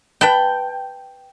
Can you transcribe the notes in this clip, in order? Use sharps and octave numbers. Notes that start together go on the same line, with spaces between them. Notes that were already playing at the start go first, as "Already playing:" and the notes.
B4 G5 A5 B5